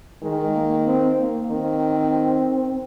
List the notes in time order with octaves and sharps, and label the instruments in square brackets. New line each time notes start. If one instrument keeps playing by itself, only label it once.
[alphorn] D#3 [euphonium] G#3
[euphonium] A#3
C4
A#3
[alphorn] D#3 [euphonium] C4